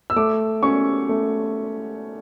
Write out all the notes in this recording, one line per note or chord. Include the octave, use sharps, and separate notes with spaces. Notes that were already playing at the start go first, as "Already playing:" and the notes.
E6
A3 D6
C#4 C#6
A3